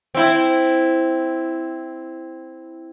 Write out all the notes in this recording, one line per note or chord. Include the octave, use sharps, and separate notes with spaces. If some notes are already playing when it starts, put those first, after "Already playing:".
C4 E4